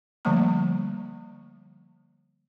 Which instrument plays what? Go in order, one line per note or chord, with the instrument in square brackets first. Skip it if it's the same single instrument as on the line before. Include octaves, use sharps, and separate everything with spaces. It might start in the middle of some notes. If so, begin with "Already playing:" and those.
[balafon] D3 F3 G3 A3 A#3 A#5